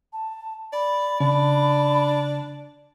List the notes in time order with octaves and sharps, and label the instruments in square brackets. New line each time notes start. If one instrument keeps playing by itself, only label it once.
[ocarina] A5
[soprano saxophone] D5 [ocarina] B5
[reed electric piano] C#3 [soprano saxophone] D4